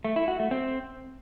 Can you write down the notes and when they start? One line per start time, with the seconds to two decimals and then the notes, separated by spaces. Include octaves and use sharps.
0.04 A3
0.16 E4
0.28 F#4
0.40 A3
0.51 C4